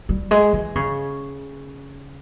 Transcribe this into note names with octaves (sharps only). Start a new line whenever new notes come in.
G3
G#3
E3
C#3